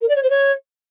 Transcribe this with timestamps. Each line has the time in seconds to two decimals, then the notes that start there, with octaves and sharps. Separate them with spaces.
0.01 A#4
0.08 D5
0.15 C#5
0.23 C5
0.30 C#5